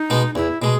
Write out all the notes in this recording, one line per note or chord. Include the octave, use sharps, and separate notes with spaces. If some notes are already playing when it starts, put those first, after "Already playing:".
Already playing: D#4
B2 G#3 B3
E2 E4
B2 G#3 G#4